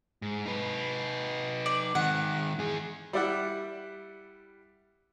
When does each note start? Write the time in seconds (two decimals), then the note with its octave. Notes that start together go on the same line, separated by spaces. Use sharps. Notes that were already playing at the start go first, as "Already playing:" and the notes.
0.22 G#2
0.46 D#4 B4
1.66 D5
1.95 G#2 D#3 F#5
2.59 E3 G#4
3.13 G3 E4 D5 E5 F#5